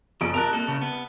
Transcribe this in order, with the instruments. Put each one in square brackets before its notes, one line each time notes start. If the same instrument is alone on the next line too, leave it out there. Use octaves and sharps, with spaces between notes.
[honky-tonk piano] F#1 D#6 D7 [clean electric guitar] F3
[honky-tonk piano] C2 A5 F#6 [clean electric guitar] A#4
[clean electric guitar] A#3 A4
C#3
B3